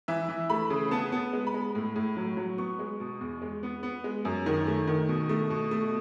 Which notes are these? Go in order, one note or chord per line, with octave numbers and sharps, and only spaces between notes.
E3 E5
E3
A3 B5
C#3
B3 A5
B3
G#3
B5
G#3
A2
A2
F#3
F#3
B3 C#6
G#3
B2
E2
G#3
B3
B3
G#3
F#2
D#3
A3
D#3
B2
A3
B2
A3